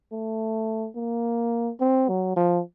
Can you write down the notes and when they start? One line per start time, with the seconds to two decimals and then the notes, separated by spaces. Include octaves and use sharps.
0.12 A3
0.96 A#3
1.80 C4
2.09 F#3
2.36 F3